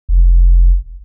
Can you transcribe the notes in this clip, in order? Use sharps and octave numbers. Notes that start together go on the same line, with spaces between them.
F1